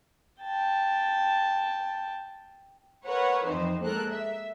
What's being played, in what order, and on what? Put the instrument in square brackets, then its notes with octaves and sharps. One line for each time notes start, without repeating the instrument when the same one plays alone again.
[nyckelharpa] G5 A5
[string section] A#4 B4 C#5 F#5
F2 E3 C4 D#4 C5
G#3 A#3 A4 A#4 F#6
E5